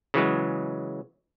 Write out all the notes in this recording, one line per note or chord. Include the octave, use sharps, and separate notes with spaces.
C#3 E3 F#3 G#3